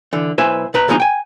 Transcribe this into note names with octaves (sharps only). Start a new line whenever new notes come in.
D3 E3
B1 E4 B4 C5 E5 G#5
B2 B4 A#5
D2 B2 F3 G#3 D#4 A#5
G5 G#5